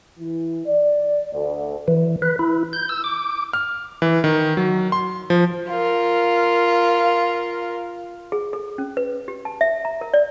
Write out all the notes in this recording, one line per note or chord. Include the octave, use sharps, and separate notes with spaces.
E3
D5
D2
E3
B4
E4
G6
E6
D6
F6
E3
D#3
F#3
C6
F3
F4 A#4
G#4
A4
C#4
B4
G4
A5
E5
A#5
A#4
D5